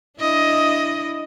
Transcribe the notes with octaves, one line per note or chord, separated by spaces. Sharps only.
D4 E4 D#5